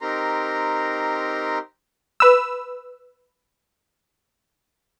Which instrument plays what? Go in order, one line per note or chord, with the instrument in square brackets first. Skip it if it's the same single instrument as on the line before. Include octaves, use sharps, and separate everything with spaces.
[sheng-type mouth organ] C4 D#4 G4 A#4 A#5 C6
[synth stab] B4 E6